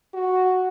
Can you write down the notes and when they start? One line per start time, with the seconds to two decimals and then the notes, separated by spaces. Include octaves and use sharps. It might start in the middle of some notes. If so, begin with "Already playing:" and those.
0.14 F#4